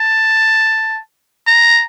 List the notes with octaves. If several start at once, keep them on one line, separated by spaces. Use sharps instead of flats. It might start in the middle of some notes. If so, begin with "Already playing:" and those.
Already playing: A5
A#5